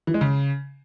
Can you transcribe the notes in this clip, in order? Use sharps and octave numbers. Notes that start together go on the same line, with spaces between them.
E3
G#3
C#3